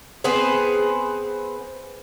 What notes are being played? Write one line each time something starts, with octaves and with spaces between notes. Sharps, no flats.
B3 C4 G#4 C5